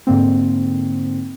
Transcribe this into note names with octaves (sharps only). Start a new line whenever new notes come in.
G#2 D3 A#3 C4